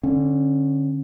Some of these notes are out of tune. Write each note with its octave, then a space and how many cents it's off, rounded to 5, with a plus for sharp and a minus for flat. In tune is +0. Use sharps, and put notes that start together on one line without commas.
D3 +0 C#4 -25